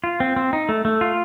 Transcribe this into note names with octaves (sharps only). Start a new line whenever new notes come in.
F4
C4
C4
D#4
A3
A3
F4